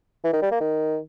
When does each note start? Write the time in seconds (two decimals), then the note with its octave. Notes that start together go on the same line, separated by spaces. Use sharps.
0.24 E3
0.33 D#3
0.42 G3
0.51 A#3
0.60 D#3